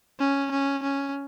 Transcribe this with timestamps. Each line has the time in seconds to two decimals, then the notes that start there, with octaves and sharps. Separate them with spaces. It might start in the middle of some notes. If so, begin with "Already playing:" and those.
0.19 C#4
0.51 C#4
0.82 C#4